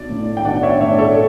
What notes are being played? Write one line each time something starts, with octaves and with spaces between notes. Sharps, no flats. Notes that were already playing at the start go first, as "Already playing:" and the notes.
Already playing: B1 D5
A2
G5
B1 D5 F#5
C#5 E5
A2 C#5 E5
D5
A4 C#5